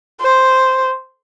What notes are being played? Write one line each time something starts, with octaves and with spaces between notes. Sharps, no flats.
C5